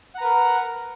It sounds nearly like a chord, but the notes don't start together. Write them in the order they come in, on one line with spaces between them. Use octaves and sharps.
F#5 A#5 B4 A#4